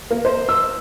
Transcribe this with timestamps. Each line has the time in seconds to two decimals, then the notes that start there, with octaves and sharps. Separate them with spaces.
0.11 A#3
0.25 C5
0.49 E6